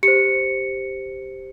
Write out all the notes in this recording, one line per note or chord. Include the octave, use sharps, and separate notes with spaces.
G4 C5 C#7